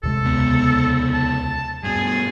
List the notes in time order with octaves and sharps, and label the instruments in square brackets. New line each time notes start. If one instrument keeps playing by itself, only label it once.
[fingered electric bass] D#2 C3 G#3 [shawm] A4
[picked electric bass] C#2 B3
[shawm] A5
[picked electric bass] G2 B2 [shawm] G#4